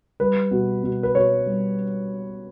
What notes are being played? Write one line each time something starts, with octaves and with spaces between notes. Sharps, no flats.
G3 B4
B2
B2
B4
B2 C#5
G3